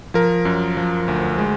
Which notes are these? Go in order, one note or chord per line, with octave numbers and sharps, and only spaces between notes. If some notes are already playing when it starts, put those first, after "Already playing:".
F3 A#4
F#2
F3
D2
G#3